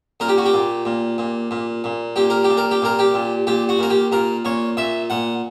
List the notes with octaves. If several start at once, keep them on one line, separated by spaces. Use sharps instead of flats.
A#2 A#4
G4
F#4
G4
A#2
A#2
A#2
A#2
A#2
A#2 G4
A#4
A#2 G4
A#4
G4
A#2 A#4
G4
A#2
A#2 G4
F#4
A#2 A#4
G4
A#2 A#4
A#2 C#5
A#2 E5
A#2 F#5